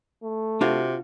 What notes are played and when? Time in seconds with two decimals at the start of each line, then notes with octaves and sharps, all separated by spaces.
0.23 A3
0.61 C3 D4 F4 F#4